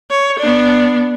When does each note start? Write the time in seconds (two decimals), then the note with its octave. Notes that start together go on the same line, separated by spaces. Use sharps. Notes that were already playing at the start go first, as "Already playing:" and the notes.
0.11 C#5
0.39 B3 D4